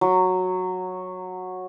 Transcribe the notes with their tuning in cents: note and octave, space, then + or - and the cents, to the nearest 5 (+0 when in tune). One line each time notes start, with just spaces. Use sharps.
F#3 -10